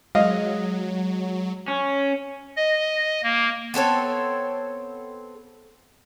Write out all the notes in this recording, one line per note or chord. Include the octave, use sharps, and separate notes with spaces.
F#3 G#3 D#5 F5
C#4
D#5
A#3
B3 C4 A4 C#5